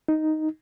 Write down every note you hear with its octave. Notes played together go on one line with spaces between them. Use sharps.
D#4